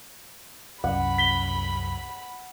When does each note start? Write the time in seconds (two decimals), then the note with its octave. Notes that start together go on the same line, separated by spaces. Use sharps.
0.84 C2 F#2 C#4 F#5 B5
1.18 B6 G7